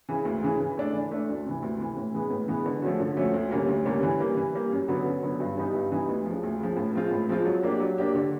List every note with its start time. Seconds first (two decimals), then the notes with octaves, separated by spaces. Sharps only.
0.09 C#3 E3
0.25 D2
0.43 C#3 E3
0.60 E3
0.77 A3 D4
0.93 E3
1.11 A3 D4
1.29 D2
1.46 C3 E3
1.62 D2
1.80 C3 E3
1.97 A2
2.14 E3 G#3 B3
2.31 A2
2.48 E3 G#3 B3
2.66 D3
2.82 F3 A3 C#4 F#4
3.00 D3
3.17 F3 A3 C#4 F#4
3.34 D2
3.51 D3 G3 A#3 C#4
3.68 D2
3.85 D3 G3 A#3 C#4
4.03 E3
4.20 G3 A#3
4.37 E3
4.55 G3 A#3
4.72 F#2
4.88 D3 F#3 B3
5.06 F#2
5.23 D3 F#3 B3
5.40 G2
5.57 E3 G3 B3 D#4
5.74 G2
5.92 E3 G3 B3 D#4
6.08 D2
6.26 C#3 F3
6.43 D2
6.60 C#3 F3
6.77 A2
6.95 F3 G#3 C4 F4
7.11 A2
7.29 F3 G#3 C4 F4
7.45 F#3
7.63 A#3 D4 G4
7.80 F#3
7.98 A#3 D4 G4
8.15 D3